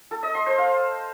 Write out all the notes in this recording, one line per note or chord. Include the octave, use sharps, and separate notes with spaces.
A4
D#5
C6
C5
F5